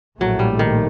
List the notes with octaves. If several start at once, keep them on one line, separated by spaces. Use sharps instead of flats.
A#1 A2 F#3 A3
G3
D#3